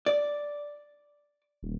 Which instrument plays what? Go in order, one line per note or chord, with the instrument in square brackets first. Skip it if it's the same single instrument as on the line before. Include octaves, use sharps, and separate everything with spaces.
[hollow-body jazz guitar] D5
[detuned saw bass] D#1